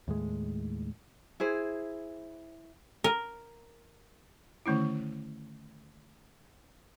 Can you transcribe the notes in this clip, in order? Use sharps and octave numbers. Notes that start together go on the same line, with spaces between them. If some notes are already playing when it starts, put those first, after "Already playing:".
D#2 A2 G#3
E4 G#4 C5
A#4
D3 D#3 A3 C#4 E4